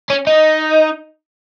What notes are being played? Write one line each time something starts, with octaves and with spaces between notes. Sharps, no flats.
C#4
D#4